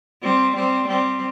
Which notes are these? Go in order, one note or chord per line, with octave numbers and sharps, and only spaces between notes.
G3 C4
G3 C4
G3 C4